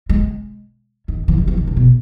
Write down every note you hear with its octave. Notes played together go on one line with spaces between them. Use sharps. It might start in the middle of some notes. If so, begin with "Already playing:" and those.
G#3
D#3
E3
D#3
E3
D#3
C#3
B2